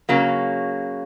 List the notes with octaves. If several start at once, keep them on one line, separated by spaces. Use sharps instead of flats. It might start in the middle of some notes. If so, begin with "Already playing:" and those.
C#3 F#3 A#3